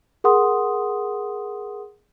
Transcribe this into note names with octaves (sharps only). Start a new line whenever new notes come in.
G#4 A#4 F#5 C6 D#6